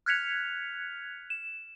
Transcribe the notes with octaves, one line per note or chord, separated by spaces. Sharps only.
F6 F#6 G#6 B6 C#7 F7
E7